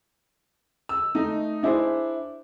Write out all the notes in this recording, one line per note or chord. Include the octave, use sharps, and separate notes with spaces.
E6
A3 D#4
D4 E4 G#4 C5 E5